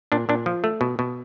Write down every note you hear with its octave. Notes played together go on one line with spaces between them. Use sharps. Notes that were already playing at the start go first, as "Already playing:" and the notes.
A#2 D4
A#2 D4
F3
A3
B2
B2